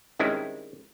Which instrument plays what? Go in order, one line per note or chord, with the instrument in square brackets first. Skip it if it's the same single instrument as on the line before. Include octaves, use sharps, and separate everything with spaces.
[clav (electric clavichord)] D#3 G3 G#3 C4 C#4 E4